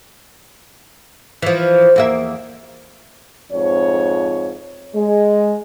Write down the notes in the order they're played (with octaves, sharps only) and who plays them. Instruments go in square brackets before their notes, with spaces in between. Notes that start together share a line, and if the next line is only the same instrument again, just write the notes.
[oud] E3 F3
E2 A#3 E5
[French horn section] F2 G#2 C#5
G#3